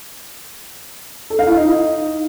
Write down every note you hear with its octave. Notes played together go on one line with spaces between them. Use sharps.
A4
F5
E4
D#4